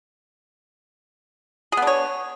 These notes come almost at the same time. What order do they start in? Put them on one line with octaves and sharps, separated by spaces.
G#4 B3 D4 C#5